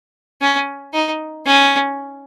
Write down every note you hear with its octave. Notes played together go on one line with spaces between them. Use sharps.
C#4
D#4
C#4